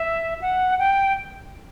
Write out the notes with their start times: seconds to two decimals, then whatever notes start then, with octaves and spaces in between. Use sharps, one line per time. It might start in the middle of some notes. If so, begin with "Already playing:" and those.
Already playing: E5
0.42 F#5
0.79 G5